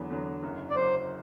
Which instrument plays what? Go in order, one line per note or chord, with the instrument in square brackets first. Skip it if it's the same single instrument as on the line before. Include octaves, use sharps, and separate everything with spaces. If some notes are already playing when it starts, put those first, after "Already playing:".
Already playing: [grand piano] E2 D3 F#3 B3
E2 D3 F#3 B3
F#1 F#2 F#3
[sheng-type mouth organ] D5
[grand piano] F#1 F#2 F#3 [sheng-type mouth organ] C5